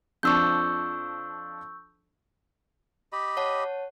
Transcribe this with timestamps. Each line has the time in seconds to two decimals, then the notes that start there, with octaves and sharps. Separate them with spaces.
0.23 F2 F3 D4 C#6 E6 G6
3.13 G4 D#5 B5
3.37 C#5 F#5 A5